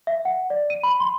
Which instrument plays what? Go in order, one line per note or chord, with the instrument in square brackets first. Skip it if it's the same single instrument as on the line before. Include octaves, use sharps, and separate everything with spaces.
[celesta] E5
F#5
D5
D#7
B5
C6